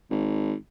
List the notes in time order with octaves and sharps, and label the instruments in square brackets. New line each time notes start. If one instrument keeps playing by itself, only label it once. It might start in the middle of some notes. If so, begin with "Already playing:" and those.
[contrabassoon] G#1